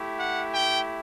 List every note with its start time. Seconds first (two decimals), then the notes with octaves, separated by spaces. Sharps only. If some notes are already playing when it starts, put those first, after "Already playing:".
Already playing: A3 E4 G4
0.16 F#5
0.53 G5